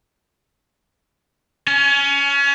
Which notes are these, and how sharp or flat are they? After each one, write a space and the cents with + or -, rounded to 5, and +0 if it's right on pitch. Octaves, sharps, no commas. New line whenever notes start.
C#4 +15 G#5 +35